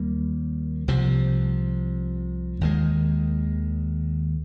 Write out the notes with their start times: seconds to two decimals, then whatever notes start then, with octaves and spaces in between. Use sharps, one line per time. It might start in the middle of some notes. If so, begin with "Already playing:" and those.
Already playing: D#2 G3 A#3
0.88 C2 C3 F3
2.61 D#2 D#3 G#3